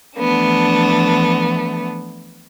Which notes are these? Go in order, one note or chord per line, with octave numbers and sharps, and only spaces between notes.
E3 F3 A3 B3 D4